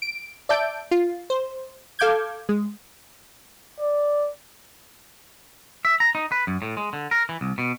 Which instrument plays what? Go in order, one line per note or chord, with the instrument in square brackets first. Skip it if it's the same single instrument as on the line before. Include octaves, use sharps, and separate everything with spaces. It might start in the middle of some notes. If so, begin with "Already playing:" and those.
[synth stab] D7
D5 E5 A5 G6 D7
F4
C5
A4 F5 D6 G6 G#6
G#3
[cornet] D5
[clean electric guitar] E5
A#5
D#4
B4
F#2
A2
G#3
D3
A#4
E3
C2
B2